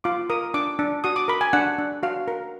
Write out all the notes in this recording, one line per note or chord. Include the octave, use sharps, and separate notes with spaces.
F4 D6
A#4 D#6
D4 D6
D4
F#4 D#6
D6
A#4 B5
G#5
D4 F#5
D4
F#4 F5
A#4